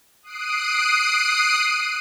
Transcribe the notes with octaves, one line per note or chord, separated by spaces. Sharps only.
D#6 F#6 C7 D7 D#7